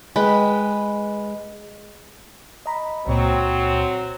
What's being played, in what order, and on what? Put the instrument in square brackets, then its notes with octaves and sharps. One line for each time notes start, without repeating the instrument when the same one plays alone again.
[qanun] G#3 B4 G5
[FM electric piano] D#5 A#5 B5
[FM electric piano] C#2 A#2 C5 [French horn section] F#3 C4